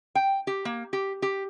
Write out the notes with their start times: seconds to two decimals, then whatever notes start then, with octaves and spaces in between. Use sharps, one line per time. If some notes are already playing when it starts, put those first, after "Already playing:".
0.15 G5
0.47 G4
0.65 A#3
0.93 G4
1.22 G4